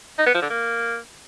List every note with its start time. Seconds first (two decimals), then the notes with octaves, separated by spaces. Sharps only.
0.18 D#4
0.26 B3
0.34 F3
0.42 D3
0.50 A#3